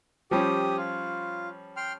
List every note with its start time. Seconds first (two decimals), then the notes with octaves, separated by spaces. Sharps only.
0.31 F3 G3 C#4 G4 D#6
0.77 F4
1.77 G5 C6 F6